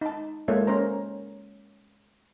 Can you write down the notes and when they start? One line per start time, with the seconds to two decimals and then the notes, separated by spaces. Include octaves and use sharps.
0.01 D#4 A5
0.48 G#3 A#3 F4 A4 C#5 E5
0.67 C#4 A#4 C5 A#5